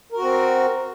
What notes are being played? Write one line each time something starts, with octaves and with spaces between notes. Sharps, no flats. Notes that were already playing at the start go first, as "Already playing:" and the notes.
C4 F#4 A#4